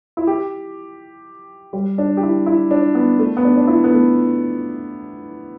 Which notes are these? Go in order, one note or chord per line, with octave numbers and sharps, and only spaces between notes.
E4
G4
G3
D4
G4
E4
E4
D4
B3
A3
B3
D4
D4
E4
B3
A3